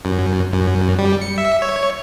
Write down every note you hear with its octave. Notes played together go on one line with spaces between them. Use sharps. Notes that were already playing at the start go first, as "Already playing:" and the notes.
F#2
F#2
G3
C#7
E5
C#5